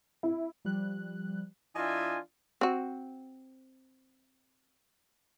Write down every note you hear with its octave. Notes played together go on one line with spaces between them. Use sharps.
E4
F3 G3 F#6
E3 D4 F4 D#5 E5 G#5
C4 F#4